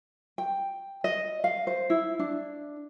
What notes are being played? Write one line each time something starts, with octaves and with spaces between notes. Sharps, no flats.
G5
D#5
F5
C5
E4
D4